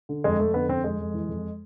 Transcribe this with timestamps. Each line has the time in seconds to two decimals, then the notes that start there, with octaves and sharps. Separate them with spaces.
0.09 D3
0.24 F2 G#3
0.39 F2 A3
0.54 D3 B3
0.69 F2 C4
0.84 F2 G#3
1.00 F2
1.14 E3
1.29 F2